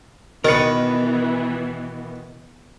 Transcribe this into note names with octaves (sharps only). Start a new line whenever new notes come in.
B2 D#3 E3 B3 A#4 B4 A6 C#7